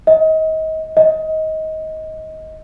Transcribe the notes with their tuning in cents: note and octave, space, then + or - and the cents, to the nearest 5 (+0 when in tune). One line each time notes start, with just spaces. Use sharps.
D#5 +30
D#5 +20